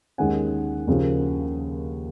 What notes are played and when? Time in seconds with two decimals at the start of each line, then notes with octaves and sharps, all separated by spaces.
0.18 D#2 D#3 G#3 C#4 F#5 G#5
0.87 D#2 C#3 F3 A#3